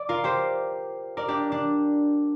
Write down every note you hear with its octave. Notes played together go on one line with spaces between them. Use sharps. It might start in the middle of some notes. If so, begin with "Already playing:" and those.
Already playing: D5
F4 A#4
G4 C5
A#4 D5
D4 G4
D4